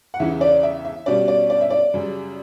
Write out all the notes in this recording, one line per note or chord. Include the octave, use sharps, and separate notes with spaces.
F#5
E2 C#3 E3 E5
D5
E5
E5
B2 G3 C#4 D5
D5
D5
E5
D5
F#2 C#3 G3